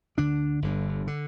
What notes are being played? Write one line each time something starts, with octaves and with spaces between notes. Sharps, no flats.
D2 D3 D4
G1 G2 D3
D3